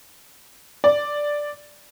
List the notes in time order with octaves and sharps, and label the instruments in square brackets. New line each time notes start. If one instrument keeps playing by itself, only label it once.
[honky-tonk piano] D5